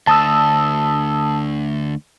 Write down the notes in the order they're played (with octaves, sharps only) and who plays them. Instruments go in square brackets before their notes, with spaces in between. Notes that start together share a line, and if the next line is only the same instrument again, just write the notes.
[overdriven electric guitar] D2 [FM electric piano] A5 D#6 E6